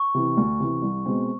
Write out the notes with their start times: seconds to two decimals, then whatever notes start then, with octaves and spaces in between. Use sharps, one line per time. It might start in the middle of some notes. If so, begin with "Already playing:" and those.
Already playing: C#6
0.15 C3 E3
0.37 D2
0.60 C3 E3
0.82 C2
1.06 B2 G#3 C4